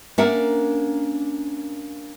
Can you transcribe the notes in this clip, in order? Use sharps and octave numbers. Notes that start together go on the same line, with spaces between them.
A#3 C#4 D4 A#4 E5 F#5